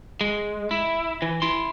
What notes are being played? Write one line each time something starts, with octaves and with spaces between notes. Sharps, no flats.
G#3
E4
E3
E4 C6